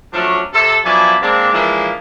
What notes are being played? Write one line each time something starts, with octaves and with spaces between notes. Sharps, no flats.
F3 F#3 A3 C#4 D4
C3 A4
B2 F3 F#3 D4 E4 G#5
G#3 A#3 C4 D4
E3 F3 G#3 A#3 D4 E4